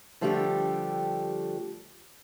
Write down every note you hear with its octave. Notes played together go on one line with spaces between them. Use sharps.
D3 F3 G3 A3 D4 G4